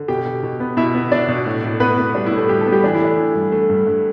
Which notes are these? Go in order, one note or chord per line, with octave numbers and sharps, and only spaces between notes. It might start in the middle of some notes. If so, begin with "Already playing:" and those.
Already playing: D3
B2 G4 G5
B2
B2
B3
B2 E4 E5
B3
B2 D4 D5
B2
A2
A2
B3 B4
B3
G3 D4
E4
A2
A3 A4
G3 G4
A4
B3
G3 G4
E3 D4
E4
A3 D4
E3
G2
A3
G2
G2